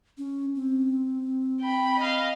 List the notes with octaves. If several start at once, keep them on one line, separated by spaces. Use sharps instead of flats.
C#4
C4
G5 B5
D#5 F5